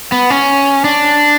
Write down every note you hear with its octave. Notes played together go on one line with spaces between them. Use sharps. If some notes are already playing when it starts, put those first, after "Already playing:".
B3
C#4
D4